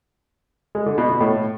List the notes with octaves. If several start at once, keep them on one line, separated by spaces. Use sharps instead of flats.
G#3
D3
B2
B2
A2